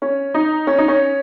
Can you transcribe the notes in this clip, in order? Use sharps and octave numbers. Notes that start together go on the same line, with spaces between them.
C#4
D#4
C#4
D#4
C#4